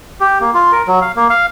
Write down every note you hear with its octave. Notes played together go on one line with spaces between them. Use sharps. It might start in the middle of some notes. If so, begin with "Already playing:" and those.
G4
A#3
F4
A#4
F#3
F5
A#3
F5